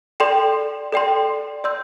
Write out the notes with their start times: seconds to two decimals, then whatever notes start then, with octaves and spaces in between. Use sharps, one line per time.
0.20 A4 D5 G5 C6
0.92 A4 D5 G5 C6
1.64 D5 C6 E6 G6